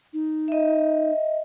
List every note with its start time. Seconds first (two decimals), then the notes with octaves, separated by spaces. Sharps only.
0.13 D#4
0.48 D#5 E5